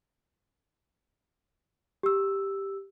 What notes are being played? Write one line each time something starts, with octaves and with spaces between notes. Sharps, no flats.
G4 E6